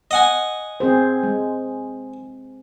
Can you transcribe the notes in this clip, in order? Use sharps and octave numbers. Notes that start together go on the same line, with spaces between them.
D#5 F#5 G#5
C4 G#4 C5
G#3